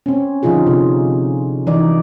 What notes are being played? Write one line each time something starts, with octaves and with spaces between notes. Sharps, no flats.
C4 C#4
D3 F3 D#4 F4 G#4
C3
E3 D#4 D5